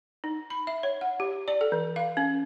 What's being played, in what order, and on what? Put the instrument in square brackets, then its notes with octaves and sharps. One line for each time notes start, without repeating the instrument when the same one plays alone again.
[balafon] D#4
B5
E5
C#5
F#5
G4
D5
A4
E3
F5
C#4